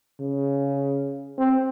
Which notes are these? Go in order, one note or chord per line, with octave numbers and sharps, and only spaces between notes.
C#3
C4